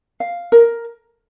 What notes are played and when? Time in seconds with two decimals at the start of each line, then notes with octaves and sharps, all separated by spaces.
0.20 F5
0.52 A#4